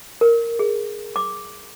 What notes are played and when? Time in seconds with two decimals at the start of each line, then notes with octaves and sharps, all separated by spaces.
0.21 A#4
0.59 G#4
1.16 D6